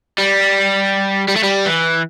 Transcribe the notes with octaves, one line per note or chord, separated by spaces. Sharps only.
G3
G3
A3
G3
E3